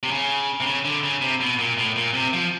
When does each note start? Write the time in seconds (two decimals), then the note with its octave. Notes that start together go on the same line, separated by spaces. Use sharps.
0.03 C3
0.11 C#3
0.60 C3
0.66 C#3
0.85 D3
1.03 C#3
1.21 C3
1.41 B2
1.59 A#2
1.78 A2
1.96 A#2
2.14 C3
2.33 F3